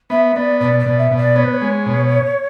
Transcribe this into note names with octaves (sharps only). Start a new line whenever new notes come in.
B3 E5
B3 D5
B2 D5
D5
B2
E5
B2
D5
B3 C#5
B4
C#5
G#3
B2